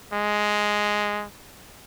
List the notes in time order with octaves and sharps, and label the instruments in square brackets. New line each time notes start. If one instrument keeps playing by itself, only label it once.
[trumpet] G#3